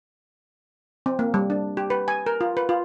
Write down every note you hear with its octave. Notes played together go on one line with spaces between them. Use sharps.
C4
A#3
G3
D4
G4
B4
G#5
A#4
F4
B4
F4